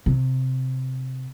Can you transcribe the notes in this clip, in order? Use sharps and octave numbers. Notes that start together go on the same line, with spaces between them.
C3